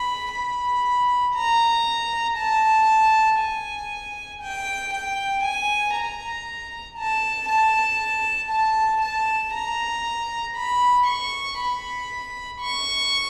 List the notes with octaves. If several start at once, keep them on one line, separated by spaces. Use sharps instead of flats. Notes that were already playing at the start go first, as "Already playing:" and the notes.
Already playing: B5
B5
A#5
A5
G#5
G5
G5
G#5
A#5
A5
A5
A5
A5
A#5
B5
C#6
B5
C#6